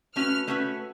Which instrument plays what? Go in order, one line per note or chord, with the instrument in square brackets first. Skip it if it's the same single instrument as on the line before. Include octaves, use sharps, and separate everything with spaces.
[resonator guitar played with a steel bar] A3 C#4 F#4 B4 [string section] F6
[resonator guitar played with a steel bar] A3 C#4 F#4 B4